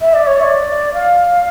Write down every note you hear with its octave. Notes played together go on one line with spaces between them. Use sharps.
E5
D5
C#5
E5
D5
F5